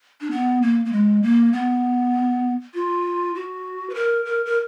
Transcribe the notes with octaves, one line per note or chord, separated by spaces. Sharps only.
D4
B3
A#3
A#3
G#3
A#3
B3
F4
F#4
B4
A#4
A#4
A#4